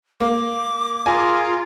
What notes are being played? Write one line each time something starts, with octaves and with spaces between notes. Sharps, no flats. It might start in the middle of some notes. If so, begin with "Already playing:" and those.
A#3 D6
F4 G#4 A#4 G#5